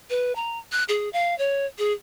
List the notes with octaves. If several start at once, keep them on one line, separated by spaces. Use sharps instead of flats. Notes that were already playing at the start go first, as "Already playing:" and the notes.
B4
A#5
F#6
G#4
F5
C#5
G#4